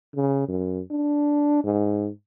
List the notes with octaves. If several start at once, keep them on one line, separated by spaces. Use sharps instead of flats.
C#3
F#2
D4
G#2